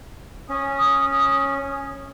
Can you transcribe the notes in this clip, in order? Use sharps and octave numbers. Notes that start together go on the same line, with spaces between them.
C#4 D#6